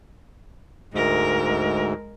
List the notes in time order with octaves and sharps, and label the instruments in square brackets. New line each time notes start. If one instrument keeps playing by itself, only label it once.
[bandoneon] D2 G#2 [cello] G#3 A#4